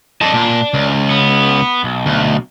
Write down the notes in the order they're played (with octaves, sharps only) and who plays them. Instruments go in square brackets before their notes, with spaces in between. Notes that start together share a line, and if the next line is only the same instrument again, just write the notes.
[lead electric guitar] A4 D#5 [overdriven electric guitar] D5 A5
[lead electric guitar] A#2
C#2
[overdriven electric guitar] B3
B1
[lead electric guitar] D2